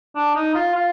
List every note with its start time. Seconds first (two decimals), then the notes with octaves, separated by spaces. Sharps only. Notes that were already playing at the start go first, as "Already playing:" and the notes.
0.15 D4
0.35 D#4
0.55 F4
0.75 F4